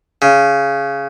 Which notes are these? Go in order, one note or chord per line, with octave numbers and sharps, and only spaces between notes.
C#3